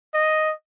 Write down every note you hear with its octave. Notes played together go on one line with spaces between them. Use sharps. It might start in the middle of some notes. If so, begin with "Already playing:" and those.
D#5